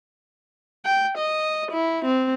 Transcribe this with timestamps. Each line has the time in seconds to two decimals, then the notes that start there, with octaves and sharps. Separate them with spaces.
0.86 G5
1.18 D#5
1.71 E4
2.05 C4